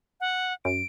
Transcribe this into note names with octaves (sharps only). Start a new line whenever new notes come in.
F#5
F#2 D7